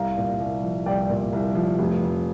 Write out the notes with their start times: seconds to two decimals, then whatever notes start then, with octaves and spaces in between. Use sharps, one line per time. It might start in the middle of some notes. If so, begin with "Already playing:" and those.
Already playing: C2 F5 A#5
0.17 A#2
0.40 C2
0.63 F3
0.86 C2 D5 G5
1.09 A#2
1.33 C2
1.55 F3
1.79 F1
2.01 F2